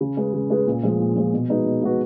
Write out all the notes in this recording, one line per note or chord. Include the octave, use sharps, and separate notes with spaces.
C#3
G#3 C#4 G#4 B4
C#3
G#3 C#4 G#4 B4
A#2
F3 G#3
A#2
F3 G#3
B2
G#3 D#4 F#4 B4
B2
G#3 D#4 F#4 B4